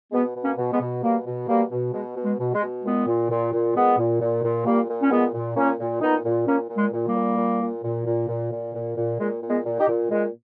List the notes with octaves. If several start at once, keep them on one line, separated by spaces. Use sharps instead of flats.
B2 G#3 B3
B2
A#3 C#4
B2
G#3 B3
B2
B2 G3 A#3
B2
B2 G3 A#3
B2
B2 G#3
B2
G#3
B2
G#3
B2
A#2 G#3 B3
A#2
A#2
A#2
A#2 G#3 B3
A#2
A#2
A#2
A#2 G3 A#3
A#2
C#4
A#2 G#3 B3
A#2
A#2 A#3 C#4
A#2
A#2 B3 D#4
A#2
A#2 A#3 C#4
A#2
G#3
A#2
G3 A#3
A#2
A#2
A#2
A#2
A#2
A#2
A#2
A#2
A#2
A#2 G#3
A#2
G#3 B3
A#2
D#4 G4
A#2
A#2 G#3